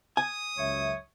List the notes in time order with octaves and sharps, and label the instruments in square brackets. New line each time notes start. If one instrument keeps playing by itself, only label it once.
[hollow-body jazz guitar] G#5 [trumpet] D#6
[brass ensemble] C#2 F#2 E5 [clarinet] C#5